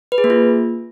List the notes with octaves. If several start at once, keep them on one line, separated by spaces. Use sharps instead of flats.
B4
G#4
A#3
F4